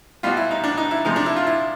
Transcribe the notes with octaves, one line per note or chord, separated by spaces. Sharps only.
B2 G3 F4
E4
D#4
D4
D#4
E4
C3 F3 G#3 D#4
D4
E4
F4
E4